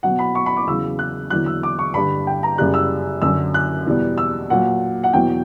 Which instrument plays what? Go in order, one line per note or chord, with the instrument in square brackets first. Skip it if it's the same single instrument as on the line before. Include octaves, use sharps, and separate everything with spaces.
[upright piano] B2 F#3 F#5
B5
C#6
B5
D6
E2 C#3 F#3 E6
F#6
E2 D3 F#3 F#6
E6
D6
C#6
G2 D3 G3 B5
G5
A#5
F#2 C#3 G3 F#6
E6
F#2 D3 F#3 E6
F#6
E2 B2 G3
E6
A#2 F#3 F#5
F#5
E2 B2 F#3 G5